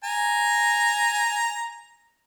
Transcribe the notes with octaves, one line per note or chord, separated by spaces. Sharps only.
G#5 A#5